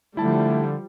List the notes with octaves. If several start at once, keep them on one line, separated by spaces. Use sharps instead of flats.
D3 F3 G3 A3 E4 A5